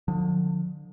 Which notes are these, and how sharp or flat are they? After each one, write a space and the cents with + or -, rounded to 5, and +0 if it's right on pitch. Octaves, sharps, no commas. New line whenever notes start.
D3 +30 F3 +40